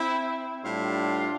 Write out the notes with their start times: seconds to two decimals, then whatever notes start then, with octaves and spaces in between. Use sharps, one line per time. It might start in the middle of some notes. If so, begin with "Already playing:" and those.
Already playing: C4 E4
0.63 A2 G3 D4 F4